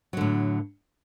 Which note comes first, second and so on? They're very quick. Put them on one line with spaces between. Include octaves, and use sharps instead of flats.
F#3 D3 A2